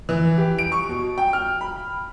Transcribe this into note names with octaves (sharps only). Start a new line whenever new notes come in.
E3
G4
D7
C#6
B2
G5
F6
B5